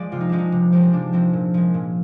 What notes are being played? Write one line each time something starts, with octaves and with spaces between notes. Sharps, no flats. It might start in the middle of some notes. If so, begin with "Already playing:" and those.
Already playing: F3 G#3 D5
C3 F4
D#4
F3 G#3 D4
D#4
C3
F3 G#3 G4
C4
C3 D4
F3 G#3 C4
A#2
F3 G#3
A#2